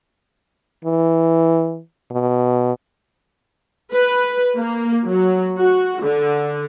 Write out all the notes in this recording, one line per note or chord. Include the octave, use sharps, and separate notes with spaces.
E3
B2
B4
A#3
F#3
F#4
D3